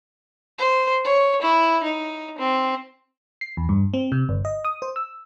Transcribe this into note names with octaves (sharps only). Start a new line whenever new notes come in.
C5
C#5
E4
D#4
C4
C7
E2
G2
C4
C3
G1
D#5
D#6
C5
E6